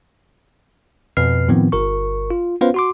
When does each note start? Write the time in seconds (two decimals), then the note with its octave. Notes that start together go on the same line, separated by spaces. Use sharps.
1.17 F2 B2 B4 F6 C7
1.48 A2 D#3 F3 B3 C4
1.72 G1 A#4 C#6
2.31 F4
2.61 B3 C#4 F4 B4 C5 F5
2.74 F#4 C6 D6